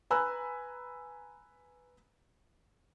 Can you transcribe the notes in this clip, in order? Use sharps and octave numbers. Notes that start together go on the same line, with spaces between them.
B4 G#5 A#5 B5 E6 F#6